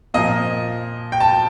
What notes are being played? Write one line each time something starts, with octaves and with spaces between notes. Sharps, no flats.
A#2 F3 A#3 D#5
G5
A5